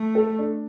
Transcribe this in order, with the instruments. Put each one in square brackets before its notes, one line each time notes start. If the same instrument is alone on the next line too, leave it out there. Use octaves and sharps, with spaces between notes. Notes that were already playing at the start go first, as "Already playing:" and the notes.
Already playing: [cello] A3
[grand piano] A4
D4